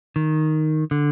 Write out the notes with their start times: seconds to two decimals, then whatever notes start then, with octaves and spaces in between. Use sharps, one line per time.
0.16 D#3
0.91 D3